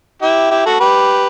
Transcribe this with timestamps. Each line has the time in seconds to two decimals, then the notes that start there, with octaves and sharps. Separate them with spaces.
0.22 E4 G4
0.51 E4 G4
0.66 F#4 A4
0.80 G4 B4